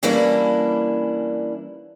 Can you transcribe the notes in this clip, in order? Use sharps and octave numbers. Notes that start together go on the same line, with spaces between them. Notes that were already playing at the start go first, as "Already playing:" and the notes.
E3 G3 A#3 C#4 D4 E4